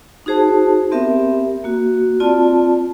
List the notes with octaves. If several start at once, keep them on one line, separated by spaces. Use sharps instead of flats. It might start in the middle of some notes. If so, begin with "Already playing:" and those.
D#4 F#4 G#4 C5 A5
B3 C4 G4 A#4 E5
A#3 F#4
C4 F4 D5 A5